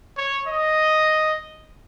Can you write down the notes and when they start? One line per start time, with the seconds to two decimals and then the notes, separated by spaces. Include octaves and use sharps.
0.17 C#5
0.48 D#5